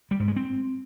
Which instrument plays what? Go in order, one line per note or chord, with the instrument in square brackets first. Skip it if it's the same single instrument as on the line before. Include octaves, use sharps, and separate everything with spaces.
[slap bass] G3
G#2
G#3
C4